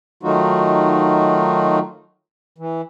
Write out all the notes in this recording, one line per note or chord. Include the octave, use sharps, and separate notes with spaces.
D#3 F#3 A3 D#4 F4 F#4
E3